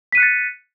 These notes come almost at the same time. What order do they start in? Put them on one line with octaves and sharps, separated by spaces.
B6 D#7 F#6 C#7 A6